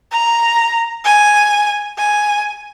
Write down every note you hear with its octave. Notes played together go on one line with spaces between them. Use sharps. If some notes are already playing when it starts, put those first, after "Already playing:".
A#5
G#5
G#5